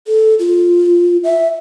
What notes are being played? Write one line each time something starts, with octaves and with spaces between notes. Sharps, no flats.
A4
F4
E5